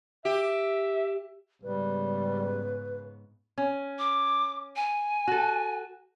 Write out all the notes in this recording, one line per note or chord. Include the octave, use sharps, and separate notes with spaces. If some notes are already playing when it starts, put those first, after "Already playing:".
G4 E5
G#2 C#3 G3 B3 B4
C#4
D6
G#5
F#4 A4